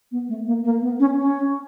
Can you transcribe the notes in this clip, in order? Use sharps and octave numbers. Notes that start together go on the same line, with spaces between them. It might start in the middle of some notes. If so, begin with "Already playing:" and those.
B3
A3
A#3
A#3
B3
C#4
C#4